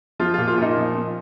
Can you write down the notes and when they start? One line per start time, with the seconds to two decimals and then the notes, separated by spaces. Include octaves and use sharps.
0.20 F3 F4
0.34 F4
0.38 A#2
0.47 F4
0.58 A#2 D#4
0.76 F3
0.95 F3